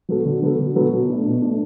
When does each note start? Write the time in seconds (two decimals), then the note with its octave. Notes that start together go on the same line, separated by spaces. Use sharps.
0.09 F#3 B3 F#4 A4
0.25 D3
0.42 F#3 B3 F#4 A4
0.59 D3
0.75 F#3 B3 F#4 A4
0.92 B2
1.09 A3 D4
1.26 B2
1.42 A3 D4